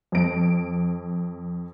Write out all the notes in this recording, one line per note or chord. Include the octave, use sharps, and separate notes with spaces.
F2 D7